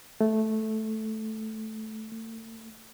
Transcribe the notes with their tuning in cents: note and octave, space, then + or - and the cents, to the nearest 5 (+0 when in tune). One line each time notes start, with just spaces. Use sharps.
A3 -10
A3 +35